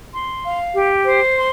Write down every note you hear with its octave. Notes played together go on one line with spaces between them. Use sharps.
C6
F5
G4
C5
C6